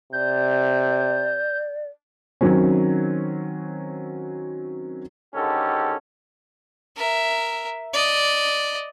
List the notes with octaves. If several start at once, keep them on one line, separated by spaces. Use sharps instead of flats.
C3 D5 G6
D#3 F#3 C4 C#4
G#2 D3 D#3 C#4 G4 A4
A#4 E5
D5 D#5